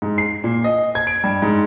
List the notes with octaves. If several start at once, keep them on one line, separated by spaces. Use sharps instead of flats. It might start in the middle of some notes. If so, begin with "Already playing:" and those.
G#2
C7
A#2
D#5
G#6
D7
G2
G#2